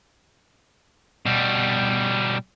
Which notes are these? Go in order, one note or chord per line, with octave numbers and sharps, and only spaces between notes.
B2 G3